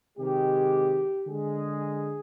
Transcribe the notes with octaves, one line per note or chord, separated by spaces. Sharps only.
C3 D#3 G#3 G4
D3 G#3 G#4